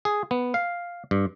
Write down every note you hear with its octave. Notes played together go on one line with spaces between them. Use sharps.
G#4
B3
F5
G2